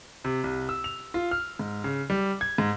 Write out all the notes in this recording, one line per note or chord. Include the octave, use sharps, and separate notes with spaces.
C3
C2
E6
F7
F4
F6
G#2
C#3
G3
G#6
G#2